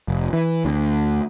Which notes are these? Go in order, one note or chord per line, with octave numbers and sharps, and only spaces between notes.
F1
E3
D2